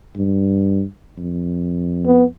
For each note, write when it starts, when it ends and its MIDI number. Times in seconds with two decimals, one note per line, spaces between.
0.16 0.84 43
1.18 2.31 41
2.06 2.25 59